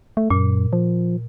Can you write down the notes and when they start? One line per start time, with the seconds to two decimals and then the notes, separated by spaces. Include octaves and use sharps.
0.17 A3
0.30 F#2 A#2
0.73 F3